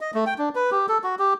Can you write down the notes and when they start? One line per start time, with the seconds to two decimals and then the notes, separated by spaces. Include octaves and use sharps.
0.01 D#5
0.14 A3
0.26 G5
0.38 D4
0.55 B4
0.71 G4
0.89 A4
1.04 F#4
1.19 G4